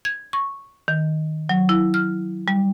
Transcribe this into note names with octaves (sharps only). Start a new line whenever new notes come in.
G#6
C#6
D#3
F#3
E4
F6
G3